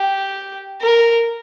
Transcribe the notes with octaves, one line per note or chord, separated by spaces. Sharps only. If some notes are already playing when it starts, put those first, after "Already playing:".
Already playing: G4
A#4